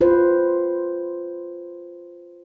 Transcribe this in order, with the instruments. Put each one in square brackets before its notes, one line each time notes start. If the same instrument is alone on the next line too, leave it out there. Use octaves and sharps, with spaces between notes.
[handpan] F4 B4 C5